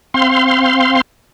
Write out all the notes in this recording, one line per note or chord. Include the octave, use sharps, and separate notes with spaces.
C4 F5 C6